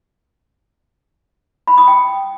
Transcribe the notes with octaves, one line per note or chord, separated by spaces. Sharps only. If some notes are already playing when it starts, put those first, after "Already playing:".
B5
D#6
G5